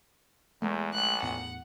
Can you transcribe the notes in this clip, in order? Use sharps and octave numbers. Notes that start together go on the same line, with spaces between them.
E2 G#3 A3
A#1 F#6
E2 A2 F#5